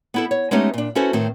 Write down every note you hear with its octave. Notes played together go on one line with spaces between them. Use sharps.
B3 E4 A4
C#5
G#3 A3 B3 C#4 D#4 G4
A#2 D4
C#4 E4 F#4 A4 B4 C5
A2 D#3 C4